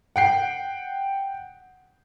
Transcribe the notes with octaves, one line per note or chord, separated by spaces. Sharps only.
F#5 G5 C7